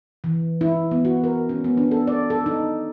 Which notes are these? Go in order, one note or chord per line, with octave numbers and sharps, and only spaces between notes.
E3
E4
B3
F#4
A#4
C#4
B3
D4
A4
D5
A4
D#4